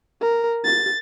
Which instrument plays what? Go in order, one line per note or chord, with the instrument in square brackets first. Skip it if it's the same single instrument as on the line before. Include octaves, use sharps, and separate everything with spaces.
[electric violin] A#4
A6